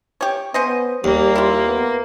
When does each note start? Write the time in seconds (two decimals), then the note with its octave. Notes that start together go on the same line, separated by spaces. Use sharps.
0.21 G4 C#5
0.54 B3 C#4 C5 D#5
1.04 D#2 G3 A#3
1.35 E4 F4
1.67 B3